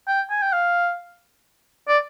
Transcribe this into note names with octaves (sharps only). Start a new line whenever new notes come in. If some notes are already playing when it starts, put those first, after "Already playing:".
G5
G#5
G5
F5
D5